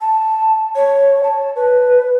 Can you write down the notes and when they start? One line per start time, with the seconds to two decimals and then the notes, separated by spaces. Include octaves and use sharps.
0.01 A5
0.76 C#5
1.24 A5
1.56 B4